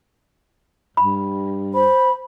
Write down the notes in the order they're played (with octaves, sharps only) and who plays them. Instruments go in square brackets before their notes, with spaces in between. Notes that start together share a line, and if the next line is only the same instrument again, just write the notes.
[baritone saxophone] G2 [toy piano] B5
[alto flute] C5 [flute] B5